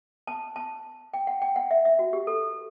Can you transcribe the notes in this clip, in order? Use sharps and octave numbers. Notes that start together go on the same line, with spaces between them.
A5
A5
G5
F#5
G5
F#5
E5
E5
F#4
G4
A4